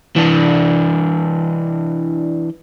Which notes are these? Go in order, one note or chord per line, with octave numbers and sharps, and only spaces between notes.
E3 D4